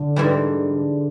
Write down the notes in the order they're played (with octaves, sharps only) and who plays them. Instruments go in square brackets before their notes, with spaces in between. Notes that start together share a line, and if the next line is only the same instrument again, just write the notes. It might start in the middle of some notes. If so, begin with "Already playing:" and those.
Already playing: [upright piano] D3
[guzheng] G#2 E3 G3